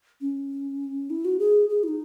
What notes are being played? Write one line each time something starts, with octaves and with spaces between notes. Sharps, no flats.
C#4
E4
F#4
G#4
G#4
E4
D#4